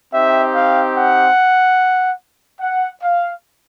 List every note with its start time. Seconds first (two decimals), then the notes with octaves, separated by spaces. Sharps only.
0.14 C4 D#4 G4 E5
0.55 F5
0.97 F#5
2.61 F#5
3.02 F5